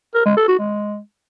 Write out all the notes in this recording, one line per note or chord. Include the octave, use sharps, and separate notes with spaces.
A#4
G#3
A4
F#4
G#3